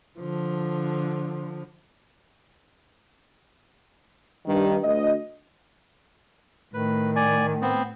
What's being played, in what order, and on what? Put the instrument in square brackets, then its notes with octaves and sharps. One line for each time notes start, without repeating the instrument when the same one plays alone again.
[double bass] D3 F3
[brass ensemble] G2 D#3
D2 D#5
[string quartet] A2 [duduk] D#3 [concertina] B4
[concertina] D5 G#5
B3 C4